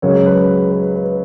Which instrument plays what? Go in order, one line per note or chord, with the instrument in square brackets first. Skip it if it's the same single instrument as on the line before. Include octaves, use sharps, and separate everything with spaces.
[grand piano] C#2 C#3 F#3 A#4 C#5
B4
B4
B4